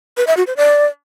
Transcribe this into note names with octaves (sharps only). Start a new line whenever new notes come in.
B4
E5
F#4
C5
D5